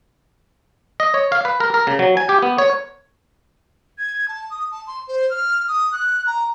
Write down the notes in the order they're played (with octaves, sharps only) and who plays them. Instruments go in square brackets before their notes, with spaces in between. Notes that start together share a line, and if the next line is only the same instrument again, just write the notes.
[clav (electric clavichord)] D#5
C#5
F5
B4
A#4
A#4
C#3
F#3
G#5
G4
B3
C#5
[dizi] G#6
A5
D#6
A5
C6
C5
F6
D#6
F#6
A#5